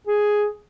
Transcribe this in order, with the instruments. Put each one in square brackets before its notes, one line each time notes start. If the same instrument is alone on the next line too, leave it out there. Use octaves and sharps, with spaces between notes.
[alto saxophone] G#4